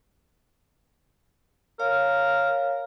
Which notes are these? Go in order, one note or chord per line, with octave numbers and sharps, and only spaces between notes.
A#4 C#5 F5